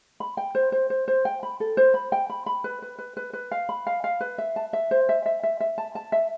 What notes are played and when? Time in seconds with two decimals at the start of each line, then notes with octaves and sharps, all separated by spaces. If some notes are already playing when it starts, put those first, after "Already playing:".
0.20 B5
0.37 G5
0.55 C5
0.72 C5
0.90 C5
1.08 C5
1.25 G5
1.43 B5
1.60 A4
1.77 C5
1.94 B5
2.12 G5
2.30 B5
2.46 B5
2.64 B4
2.82 B4
2.99 B4
3.17 B4
3.33 B4
3.51 F5
3.69 B5
3.87 F5
4.04 F5
4.21 B4
4.38 E5
4.56 A5
4.73 E5
4.91 C5
5.09 E5
5.26 E5
5.43 E5
5.60 E5
5.78 A5
5.95 A5
6.12 E5